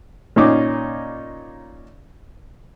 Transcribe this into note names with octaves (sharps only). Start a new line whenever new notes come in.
A#2 C#4 D#4 D6